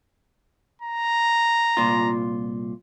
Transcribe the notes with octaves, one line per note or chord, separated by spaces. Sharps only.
A#5
C2 A#2 F4